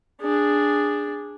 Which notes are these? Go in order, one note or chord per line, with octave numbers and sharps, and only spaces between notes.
D4 G#4